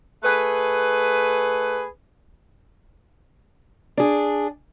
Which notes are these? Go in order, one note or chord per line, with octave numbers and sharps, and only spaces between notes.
A3 G#4 B4
D4 G#4